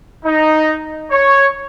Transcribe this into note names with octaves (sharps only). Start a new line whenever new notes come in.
D#4
C#5